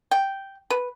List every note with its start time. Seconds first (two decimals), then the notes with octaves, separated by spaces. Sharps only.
0.11 G5
0.70 B4